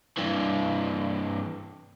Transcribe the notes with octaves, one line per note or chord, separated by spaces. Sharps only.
G2 E3